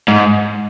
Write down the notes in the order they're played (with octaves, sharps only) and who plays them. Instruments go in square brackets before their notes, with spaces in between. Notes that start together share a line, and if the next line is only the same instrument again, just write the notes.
[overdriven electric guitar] G#2